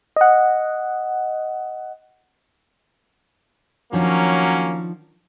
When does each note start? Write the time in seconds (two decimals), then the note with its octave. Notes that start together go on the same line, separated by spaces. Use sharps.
0.16 D#5 F#5
3.93 D#3 F3 F#3 A#3 C#4 D4